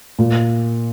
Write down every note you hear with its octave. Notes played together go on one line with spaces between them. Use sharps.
A#2